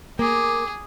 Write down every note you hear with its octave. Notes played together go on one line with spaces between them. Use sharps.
A#3 G#4 D6